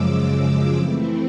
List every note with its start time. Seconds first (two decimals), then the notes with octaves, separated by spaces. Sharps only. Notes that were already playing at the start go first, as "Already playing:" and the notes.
Already playing: F#2 C#3 F3 G#3 D6 E6
0.76 E3 A3 C4 E4